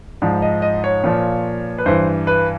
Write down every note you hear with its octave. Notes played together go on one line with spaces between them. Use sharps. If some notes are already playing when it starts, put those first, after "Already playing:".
G#2 F3 D5
D#5
D#5
C#5
A#2 F3
B4
G2 E3 C5
B4